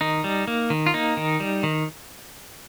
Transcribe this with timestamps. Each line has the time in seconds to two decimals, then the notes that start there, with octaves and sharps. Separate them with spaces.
0.01 D#3 D#4
0.24 G3
0.48 A#3
0.70 D#3
0.87 F4
0.94 A#3 D#4
1.17 D#3
1.40 G3
1.63 D#3